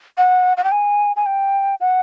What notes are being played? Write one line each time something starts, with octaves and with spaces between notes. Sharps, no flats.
F#5
F#5
G5
G#5
G#5
G5
F#5